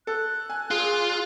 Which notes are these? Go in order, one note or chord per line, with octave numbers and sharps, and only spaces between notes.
A4 F#6
G#5
A#2 F4 G#4